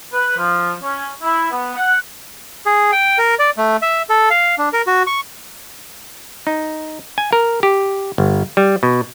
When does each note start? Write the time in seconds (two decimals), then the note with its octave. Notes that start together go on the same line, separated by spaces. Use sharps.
0.13 B4
0.38 F3
0.83 C#4
1.23 E4
1.51 B3
1.75 F#5
2.66 G#4
2.92 G5
3.18 A#4
3.39 D5
3.58 A3
3.82 E5
4.10 A4
4.30 F5
4.58 D4
4.73 A#4
4.87 F#4
5.07 C#6
6.47 D#4
7.18 G#5
7.33 A#4
7.63 G4
8.18 G1
8.57 G3
8.83 B2